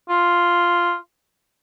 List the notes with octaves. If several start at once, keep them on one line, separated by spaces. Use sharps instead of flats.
F4